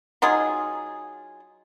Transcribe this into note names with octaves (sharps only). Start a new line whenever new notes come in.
F#3 D#4 F4 G#4